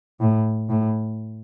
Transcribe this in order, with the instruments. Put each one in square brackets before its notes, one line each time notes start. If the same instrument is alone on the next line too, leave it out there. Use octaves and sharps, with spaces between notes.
[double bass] A2
A2